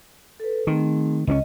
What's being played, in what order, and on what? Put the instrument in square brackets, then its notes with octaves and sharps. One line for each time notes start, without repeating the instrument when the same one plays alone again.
[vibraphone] A4 B4
[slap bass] D#3 [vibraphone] A3 C4 G#4
[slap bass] C#2 C4 C#4 [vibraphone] D#5